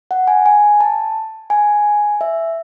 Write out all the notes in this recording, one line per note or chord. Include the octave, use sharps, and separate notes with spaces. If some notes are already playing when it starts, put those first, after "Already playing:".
F#5
G#5
G#5
A5
G#5
E5